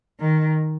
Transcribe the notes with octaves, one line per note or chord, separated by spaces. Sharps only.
D#3